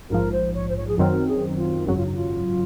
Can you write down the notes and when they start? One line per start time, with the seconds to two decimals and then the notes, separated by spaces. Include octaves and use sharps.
0.10 A#1 G#2 F3 A#4
0.32 C5
0.54 C#5
0.69 C5
0.77 C#5
0.88 G#4
0.98 F#2 D#3 F#3 C4 A#4
1.28 G#4
1.47 D#4
1.57 F4
1.86 G#1 F#2 C#3 F#3 F#4
1.97 F4
2.05 D#4
2.15 F4